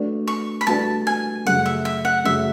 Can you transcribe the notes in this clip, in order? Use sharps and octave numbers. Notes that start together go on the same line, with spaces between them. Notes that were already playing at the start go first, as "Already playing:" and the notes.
Already playing: A3 D4 F#4 B4 D5
C#6
B5
A3 D4 F#4 B4 D5 A5
G#5
F#2 C#3 F#3 A3 F#5
E5
E5
F#5
F#2 C#3 F#3 A3 E5